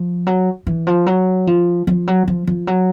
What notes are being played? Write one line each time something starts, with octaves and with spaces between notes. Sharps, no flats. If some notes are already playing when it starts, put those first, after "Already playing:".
Already playing: F3
F#3
E3
F3
F#3
F3
F3
F#3
F3
F3
F#3